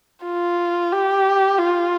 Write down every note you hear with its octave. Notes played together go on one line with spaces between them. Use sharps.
F4
G4
F4